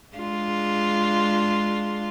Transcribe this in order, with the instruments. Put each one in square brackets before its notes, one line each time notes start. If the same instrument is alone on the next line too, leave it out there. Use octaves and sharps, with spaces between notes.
[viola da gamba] G#3 D4 F4